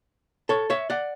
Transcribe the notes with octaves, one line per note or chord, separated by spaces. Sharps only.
A4 C#5
C#5 E5
D5 F#5